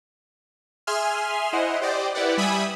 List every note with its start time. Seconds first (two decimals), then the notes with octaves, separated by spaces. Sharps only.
0.87 G#4 E5 G#5 C6 F6
1.53 E4 C5 D#5 F#5
1.81 G4 C5 D5 D#5
2.15 E4 G4 B4 D5 F#5
2.38 G3 E5 G#5 B5 D#6